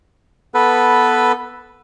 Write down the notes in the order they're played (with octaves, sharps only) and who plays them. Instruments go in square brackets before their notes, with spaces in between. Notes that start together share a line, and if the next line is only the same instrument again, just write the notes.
[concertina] B3 A4 B4